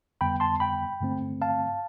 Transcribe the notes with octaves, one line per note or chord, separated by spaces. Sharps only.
F2 D3 G3 B3 G5 B5
A5 C6
G5 B5
G2 D3 A3 C4
F5 A5